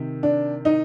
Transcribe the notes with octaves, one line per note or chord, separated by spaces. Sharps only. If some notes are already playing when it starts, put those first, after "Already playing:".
Already playing: C3 D#3
D4
D#4